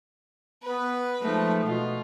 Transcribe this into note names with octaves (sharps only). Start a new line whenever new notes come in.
B3 B4
F3 G#3 A3 D#4
B2 F4